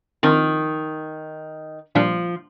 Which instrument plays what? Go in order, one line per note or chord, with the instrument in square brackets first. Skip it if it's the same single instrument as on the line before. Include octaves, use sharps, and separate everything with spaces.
[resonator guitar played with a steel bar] D#3 [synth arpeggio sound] F3 C4 F4 A#4
[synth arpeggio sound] A#2 G3 D4 [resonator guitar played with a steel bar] F3